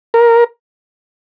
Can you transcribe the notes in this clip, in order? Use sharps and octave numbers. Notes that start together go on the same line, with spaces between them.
A#4